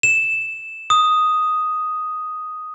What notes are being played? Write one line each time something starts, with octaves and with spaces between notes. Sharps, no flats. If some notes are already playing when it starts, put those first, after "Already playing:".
E7
D#6